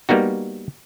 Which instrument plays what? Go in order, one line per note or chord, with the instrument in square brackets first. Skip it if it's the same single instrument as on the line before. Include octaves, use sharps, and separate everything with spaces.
[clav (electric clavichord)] G3 A#3 B3 D#4 F#4